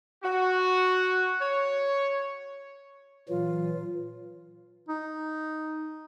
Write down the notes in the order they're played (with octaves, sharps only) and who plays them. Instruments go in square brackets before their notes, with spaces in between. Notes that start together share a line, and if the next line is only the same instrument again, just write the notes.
[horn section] F#4
C#5
[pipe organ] A#2 E3 F#3 [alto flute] F4
[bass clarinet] D#4